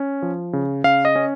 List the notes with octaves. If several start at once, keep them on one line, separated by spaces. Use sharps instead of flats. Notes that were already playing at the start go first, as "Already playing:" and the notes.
Already playing: C#4
F3
C#3
C#3 F5
D#5
C#4